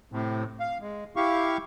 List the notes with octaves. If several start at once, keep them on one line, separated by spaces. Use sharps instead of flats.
A2 C3
F5
G#3
E4 G4 F5 C#6